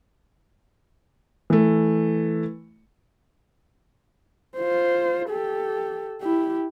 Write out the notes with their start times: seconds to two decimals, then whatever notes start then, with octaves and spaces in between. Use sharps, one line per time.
1.50 E3 A3
4.56 F4 C5
5.29 G4 A4
6.21 E4 G4